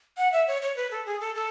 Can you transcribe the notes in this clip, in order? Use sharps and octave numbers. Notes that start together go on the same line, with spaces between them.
F#5
E5
C#5
C#5
B4
A4
G#4
A4
A4